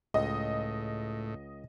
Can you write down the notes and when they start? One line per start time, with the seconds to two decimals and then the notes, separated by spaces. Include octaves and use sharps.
0.14 C#2 A2 D#5